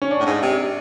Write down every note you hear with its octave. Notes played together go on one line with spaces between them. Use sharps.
C#4
D4
A2
G#2
C3